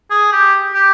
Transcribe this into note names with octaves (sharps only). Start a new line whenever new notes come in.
G#4
G4
G4